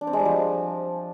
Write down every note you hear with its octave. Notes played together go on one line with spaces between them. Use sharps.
D4
C4
G#3
G3
F3